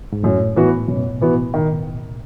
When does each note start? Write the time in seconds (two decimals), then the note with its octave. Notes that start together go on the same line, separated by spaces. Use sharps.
0.13 G#2
0.24 F#2 A2
0.56 E3 B3 F#4
0.88 F#2 B2
1.21 E3 B3 F#4
1.54 D#3